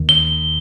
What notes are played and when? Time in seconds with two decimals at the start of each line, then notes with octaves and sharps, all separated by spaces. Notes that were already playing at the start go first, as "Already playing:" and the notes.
Already playing: D#2 D#3
0.09 G7